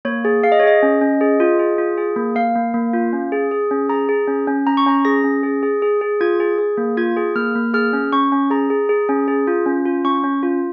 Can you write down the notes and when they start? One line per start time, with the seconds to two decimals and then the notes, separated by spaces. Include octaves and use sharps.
0.05 A#3 C#5
0.25 G#4
0.44 G#4 F5
0.52 D#5
0.60 C#5
0.63 G#4 D#5
0.83 C#4
1.01 C#4
1.21 G#4
1.40 F4
1.59 G#4
1.78 F4
1.97 G#4
2.16 A#3
2.36 A#3 F5
2.55 A#3
2.74 A#3
2.93 F4
3.13 C#4
3.32 G#4
3.51 G#4
3.71 C#4
3.89 G#4 A#5
4.09 G#4
4.27 C#4
4.47 C#4
4.67 C#4 A#5
4.77 C#6
4.86 C#4 A#5
5.05 G#4 A#6
5.24 C#4
5.43 G#4
5.63 G#4
5.82 G#4
6.01 G#4
6.21 F4 G#6
6.40 G#4
6.58 G#4
6.78 A#3
6.97 F4 G#6
7.16 G#4
7.35 A#3 F6
7.55 A#3
7.74 G#4 F6
7.93 C#4
8.12 C#4 C#6
8.32 C#4
8.50 G#4 A#5
8.70 G#4
8.89 G#4
9.09 C#4
9.28 G#4
9.47 F4
9.66 C#4
9.85 F4
10.05 C#4 C#6
10.24 C#4
10.43 F4